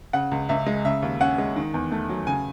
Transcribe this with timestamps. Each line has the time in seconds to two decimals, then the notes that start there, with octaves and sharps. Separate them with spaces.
0.13 C#3 F#5
0.31 C#2
0.49 C#2 E5
0.66 G#3
0.85 C#3 E5
1.02 D#2
1.20 C#4 F#5
1.38 G#3
1.56 D#3
1.74 E2
1.92 A3
2.09 F#3
2.27 C#3 G#5